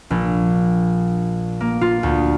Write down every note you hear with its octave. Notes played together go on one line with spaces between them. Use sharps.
A#1
A#3
F4
D2